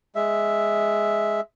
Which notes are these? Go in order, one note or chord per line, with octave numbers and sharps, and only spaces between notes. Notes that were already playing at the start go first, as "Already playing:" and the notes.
G#3 E5